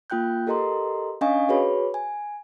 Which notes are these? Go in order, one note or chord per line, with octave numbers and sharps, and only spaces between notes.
A#3 F4 G5 F#6 G6
G4 A4 A#4 D#5 A#5 C6
C#4 D4 D#5 F5 G#5 C#6
F#4 G#4 B4 C#5 B5
G#5